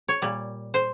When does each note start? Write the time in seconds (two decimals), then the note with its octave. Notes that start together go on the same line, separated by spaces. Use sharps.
0.08 C#5
0.22 A#2 G3
0.74 C5